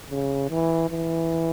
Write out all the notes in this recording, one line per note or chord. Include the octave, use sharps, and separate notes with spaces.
C#3
E3
E3